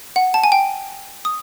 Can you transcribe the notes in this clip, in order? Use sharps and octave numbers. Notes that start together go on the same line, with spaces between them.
F#5
A5
G#5
G5
D#6